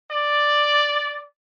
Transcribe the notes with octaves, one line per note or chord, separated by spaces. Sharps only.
D5